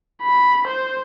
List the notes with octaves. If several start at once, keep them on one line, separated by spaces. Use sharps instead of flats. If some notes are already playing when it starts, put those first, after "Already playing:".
B5
C5